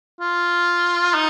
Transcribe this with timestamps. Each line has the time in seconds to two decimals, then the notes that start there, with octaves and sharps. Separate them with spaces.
0.20 F4
1.14 D#4